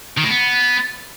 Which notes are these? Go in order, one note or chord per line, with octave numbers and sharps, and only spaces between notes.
D#3
A2
B3